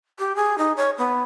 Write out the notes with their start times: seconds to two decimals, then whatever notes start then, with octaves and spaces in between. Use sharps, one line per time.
0.19 G4
0.36 G#4
0.58 D#4
0.77 C#5
0.98 B3